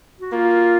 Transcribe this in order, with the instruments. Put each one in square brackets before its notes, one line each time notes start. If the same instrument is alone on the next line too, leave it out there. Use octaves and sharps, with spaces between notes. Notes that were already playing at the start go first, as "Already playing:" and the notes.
[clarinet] F#4
[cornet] A#3 [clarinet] F4